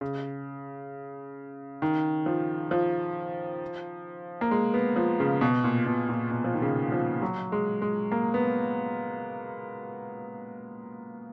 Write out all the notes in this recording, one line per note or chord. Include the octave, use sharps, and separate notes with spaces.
C#3
D#3
F3
F3
A#3
G#3
B3
F3
C#3
B2
A#2
B2
A#2
B2
F3
D#3
C#3
F3
F#3
G#3
G#3
A#3
B3